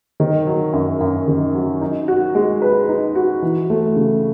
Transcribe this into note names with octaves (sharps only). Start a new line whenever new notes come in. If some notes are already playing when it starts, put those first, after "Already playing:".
D#3
F#3
F#2
F#2
D#3
F#3
D#4
F#4
G#3
B4
D#4
F#4
E3
A3
C#3